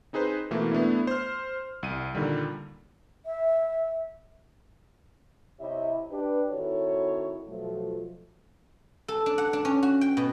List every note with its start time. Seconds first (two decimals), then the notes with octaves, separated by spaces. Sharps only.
0.13 C4 D#4 G#4 B4 C5
0.51 B2 E3 A3 A#3
0.72 A3 B3 D4 E4
1.07 C5 F6
1.83 C2 D#7
2.15 A#2 D3 D#3 G3
3.26 E5
5.60 C3 E4 G4 C#5 D#5 E5
6.11 D4 G4 B4
6.50 D#3 C4 E4 F#4 A4 C#5
7.48 B2 F3 F#3 A3
9.08 A4
9.26 D4
9.38 F#5
9.53 D4
9.65 C#4
9.83 F#4
10.01 G5
10.17 B2